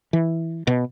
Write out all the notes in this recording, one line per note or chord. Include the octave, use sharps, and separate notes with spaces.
E3
B2